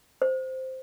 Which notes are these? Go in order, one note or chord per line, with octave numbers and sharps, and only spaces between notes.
C5